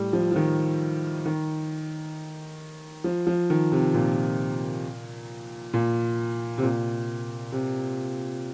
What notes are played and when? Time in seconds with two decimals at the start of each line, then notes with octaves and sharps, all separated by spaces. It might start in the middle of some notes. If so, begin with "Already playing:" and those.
Already playing: A2 G3
0.13 F3
0.32 F3
0.36 D#3
1.26 D#3
3.04 F3
3.27 F3
3.50 D#3
3.72 C3
3.94 A#2
5.73 A#2
6.58 C3
6.63 A#2
7.52 C3